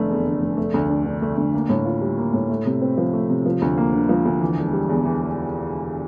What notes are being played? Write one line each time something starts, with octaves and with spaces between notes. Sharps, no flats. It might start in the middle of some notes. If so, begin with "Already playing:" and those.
Already playing: F1 D3 A3
E2
D3
F1
A3
D2
D4
D3
A3
D2
A#3
A2
F4
G3
A#3
A2
A3
C3
C4
F3
A3
C3
F3
D2
A#3
D3
F3
D2
E3
E1
G3
E2
E3